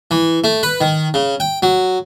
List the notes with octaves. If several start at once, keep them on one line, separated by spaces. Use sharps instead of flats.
E3
A3
B4
D#3
C#3
G5
F#3